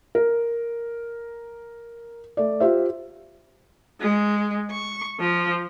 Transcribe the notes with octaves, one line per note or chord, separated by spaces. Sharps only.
A#4
A3 D5
F4 G4 C5 E5
G#3
C#6
F3